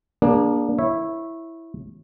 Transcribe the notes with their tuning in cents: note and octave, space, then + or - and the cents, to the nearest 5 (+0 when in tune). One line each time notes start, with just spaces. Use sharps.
A#3 +25 D4 +0 G#4 -25
E4 +0 C#5 -20 E5 +0